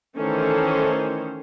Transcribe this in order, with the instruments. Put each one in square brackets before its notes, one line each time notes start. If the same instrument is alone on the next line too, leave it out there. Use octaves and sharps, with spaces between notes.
[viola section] D#3 E3 A3 C#4 A4 C5